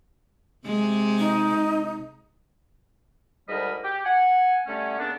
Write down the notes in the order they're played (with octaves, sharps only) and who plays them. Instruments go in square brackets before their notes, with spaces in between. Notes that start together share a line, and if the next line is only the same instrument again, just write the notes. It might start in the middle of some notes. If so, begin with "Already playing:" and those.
[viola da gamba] C3 G#3
[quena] D#4
[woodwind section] D2 G#2 G3 A#4 D#5 B5
G4
F#5 G#5
D3 G3 A3 C#4
C#3 A#3 B3 D4